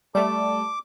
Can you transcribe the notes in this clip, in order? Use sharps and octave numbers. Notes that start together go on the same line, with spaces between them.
G3 A3 A4 D5 D6